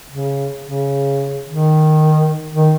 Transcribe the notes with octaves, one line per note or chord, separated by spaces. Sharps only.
C#3
C#3
D#3
D#3